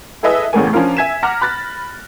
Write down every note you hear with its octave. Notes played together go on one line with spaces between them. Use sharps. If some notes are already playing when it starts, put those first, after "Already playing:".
E4 G#4 A4 B4 D#5 E5
A1 E2 A2 C#3 A#3 G#5
F3 C#4 D4 F4 A#4 F5
E5 G#5 G#6 B6 E7
F#5 A#5 D6 F6 A#6
B5 F#6 A6 A#6